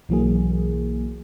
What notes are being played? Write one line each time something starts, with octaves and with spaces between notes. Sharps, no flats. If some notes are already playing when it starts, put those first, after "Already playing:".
B1 E3 F#3 A#3 G#4